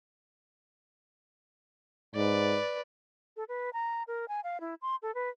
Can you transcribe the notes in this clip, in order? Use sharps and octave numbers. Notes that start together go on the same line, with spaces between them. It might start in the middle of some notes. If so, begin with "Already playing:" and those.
G#2 B4 D5
A4
B4
A#5
A#4
G#5
F5
E4
C6
A4
B4